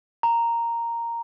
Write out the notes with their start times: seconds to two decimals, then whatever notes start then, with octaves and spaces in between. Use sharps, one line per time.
0.23 A#5